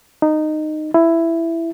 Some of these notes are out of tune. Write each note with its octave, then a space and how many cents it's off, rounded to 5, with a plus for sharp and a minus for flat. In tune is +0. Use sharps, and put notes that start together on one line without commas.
D#4 -15
E4 +10